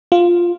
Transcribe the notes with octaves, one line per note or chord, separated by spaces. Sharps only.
F4